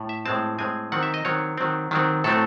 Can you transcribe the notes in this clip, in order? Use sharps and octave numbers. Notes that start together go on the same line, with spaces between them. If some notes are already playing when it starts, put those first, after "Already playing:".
Already playing: A2
E5
A2 G#3 C4 A5
A2 G#3 C4 G#5
D#3 F#3 C4 F#5
E5
D#5
D#3 F#3 C4 C#5
D#3 F#3 C4
D#3 F#3 C4
A2 F#3 A3 C4 A4